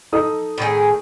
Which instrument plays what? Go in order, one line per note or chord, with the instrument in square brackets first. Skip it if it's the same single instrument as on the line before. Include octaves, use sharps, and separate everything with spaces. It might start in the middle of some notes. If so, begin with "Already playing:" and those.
[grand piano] D#4 A4 D#6
[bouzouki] A2 D#3 G#4